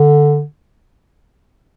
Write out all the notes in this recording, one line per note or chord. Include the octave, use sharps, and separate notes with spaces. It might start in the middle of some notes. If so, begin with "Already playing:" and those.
Already playing: D3